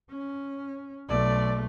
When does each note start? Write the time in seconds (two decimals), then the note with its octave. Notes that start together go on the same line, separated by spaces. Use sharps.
0.11 C#4
1.09 B1 A3 D5